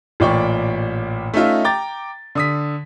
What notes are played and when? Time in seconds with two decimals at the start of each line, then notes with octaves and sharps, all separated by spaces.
0.20 A1 A#2 D5 G5 C#6
1.34 A3 C#4 D#4 F4 E5
1.65 G5 A#5 D6 A6
2.35 D3 D#6 B6